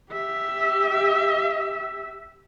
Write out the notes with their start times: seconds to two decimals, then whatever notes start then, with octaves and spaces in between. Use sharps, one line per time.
0.11 G4 E5